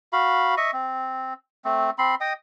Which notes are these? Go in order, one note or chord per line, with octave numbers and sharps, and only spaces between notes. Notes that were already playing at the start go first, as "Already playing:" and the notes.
F#4 F5 B5
D#5 E5 C#6
C4
A3 C4
C4 B5 C6
D#5 G5 D#6